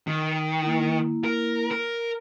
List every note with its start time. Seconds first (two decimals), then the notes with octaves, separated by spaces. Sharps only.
0.07 D#3
0.62 A#3 E4
1.24 A#4
1.71 A#4